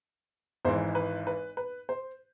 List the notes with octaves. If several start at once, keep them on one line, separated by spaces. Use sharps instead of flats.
G#1 G#2 E3 C5
B4
B4
B4
C5